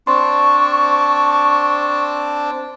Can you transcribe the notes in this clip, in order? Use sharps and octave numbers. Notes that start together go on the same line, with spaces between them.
C4 D4 A5 C6 C#6